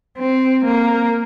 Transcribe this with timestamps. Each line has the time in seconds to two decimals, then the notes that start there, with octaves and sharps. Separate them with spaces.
0.18 C4
0.65 A#3